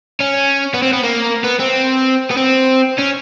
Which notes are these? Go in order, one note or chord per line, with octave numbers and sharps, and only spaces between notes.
C#4
B3
C4
B3
A#3
B3
C4
B3
C4
C#4